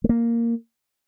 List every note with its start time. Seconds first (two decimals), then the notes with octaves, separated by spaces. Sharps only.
0.04 A3
0.09 A#3